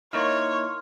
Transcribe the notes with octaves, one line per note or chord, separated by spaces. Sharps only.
A#3 D#4 E4 C#5 C6 C#6 F6